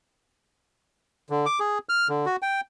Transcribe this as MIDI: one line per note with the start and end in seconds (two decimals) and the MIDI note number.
1.30 1.46 50
1.46 1.59 86
1.60 1.78 68
1.89 2.08 89
2.09 2.26 50
2.26 2.36 66
2.42 2.61 79